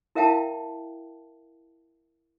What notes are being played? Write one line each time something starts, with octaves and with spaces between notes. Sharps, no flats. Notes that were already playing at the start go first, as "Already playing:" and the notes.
E4 A#4 E5 F5 G5 A5